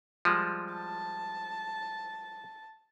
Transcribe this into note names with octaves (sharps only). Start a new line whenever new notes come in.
F3 G3 G#3
A5